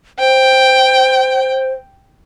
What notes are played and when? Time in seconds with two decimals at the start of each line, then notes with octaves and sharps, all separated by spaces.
0.20 C5 G5